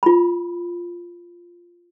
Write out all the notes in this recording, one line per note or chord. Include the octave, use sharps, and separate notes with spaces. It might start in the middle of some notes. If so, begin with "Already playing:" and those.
F4 B5